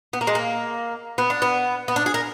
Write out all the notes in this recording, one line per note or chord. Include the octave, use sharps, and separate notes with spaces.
B3
A#3
G#3
A#3
B3
D4
B3
B3
D4
G#4
A#4